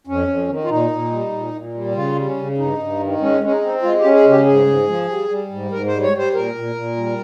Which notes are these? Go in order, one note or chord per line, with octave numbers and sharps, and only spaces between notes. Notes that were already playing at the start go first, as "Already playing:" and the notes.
F2 C#4
F2
D#3
F4
A#2 D#4
A#2
G3
A#2
A#2
G3
C#3 F4
G3
C#4
C#3
G2 D#4
G2
D#3
G#3 C#4
G#3 C#4
D#4
C4
G#3 F4
G4
C#4
G#4
C#3
G4
G#2 G#4
G#2
F3
G3
G3
G#2
G#2 A#4
G3 C5
C#5
G3 C5
A#2 A#4
A#2
A#2
G3